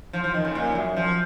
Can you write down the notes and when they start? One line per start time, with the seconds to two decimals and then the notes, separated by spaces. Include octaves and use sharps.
0.13 F3
0.24 F3
0.34 D#3
0.45 C#3
0.55 A#2
0.75 F#2
0.96 F3